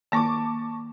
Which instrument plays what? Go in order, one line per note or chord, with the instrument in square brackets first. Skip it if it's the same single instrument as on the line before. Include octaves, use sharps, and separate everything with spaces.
[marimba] D#3 A#3 [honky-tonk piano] A5 C#6 D6